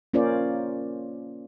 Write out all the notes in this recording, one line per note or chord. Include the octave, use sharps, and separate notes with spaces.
A#3 C#4 F4 A#4 C5 D5